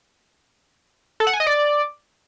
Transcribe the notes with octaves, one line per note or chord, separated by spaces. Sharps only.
A4
F#5
G#5
D#5
D5